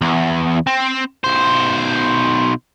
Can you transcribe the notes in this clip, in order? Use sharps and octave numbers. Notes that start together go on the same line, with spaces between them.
E2
C4
B1 C5